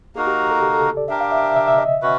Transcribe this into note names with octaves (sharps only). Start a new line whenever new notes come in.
A#3 D#4 F#4 G#4 A#4
G4
A4
G4
A4
D5
D4 G4 A#4 E5
F5
E5
E5
E5
E5
D#5
C#4 F#4 B4